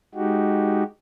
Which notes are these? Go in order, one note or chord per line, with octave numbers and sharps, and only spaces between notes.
G#3 D#4 F#4 G4